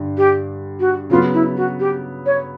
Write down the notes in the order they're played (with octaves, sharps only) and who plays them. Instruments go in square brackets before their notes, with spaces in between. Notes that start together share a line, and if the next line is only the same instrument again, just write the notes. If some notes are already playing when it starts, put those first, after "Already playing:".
Already playing: [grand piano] G2 D3
[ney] G4
F#4
[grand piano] C#3 F#3 B3 [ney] F4
[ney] E4
F#4
G4
C#5